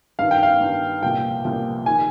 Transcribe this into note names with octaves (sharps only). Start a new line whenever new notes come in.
G2 D#3 F5
G5
F5
G2 D#3
C2 A#2 F3 G5
C2 A#2 F3
D#3 G#5